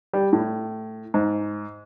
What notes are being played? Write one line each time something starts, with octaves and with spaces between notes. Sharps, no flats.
G3
A2
G#2